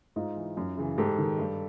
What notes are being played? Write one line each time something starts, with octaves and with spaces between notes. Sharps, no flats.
G#2 D#4 F4
E3
F#2
C#3 E3
G#2 G4 A4
D#3
G2